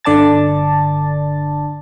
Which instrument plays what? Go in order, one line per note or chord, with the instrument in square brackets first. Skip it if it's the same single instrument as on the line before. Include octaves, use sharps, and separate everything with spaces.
[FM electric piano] G1 D3 D5 A5 A6